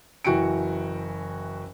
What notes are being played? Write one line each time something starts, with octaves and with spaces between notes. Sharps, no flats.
F#1 E3 F#4 G5 C#7 D7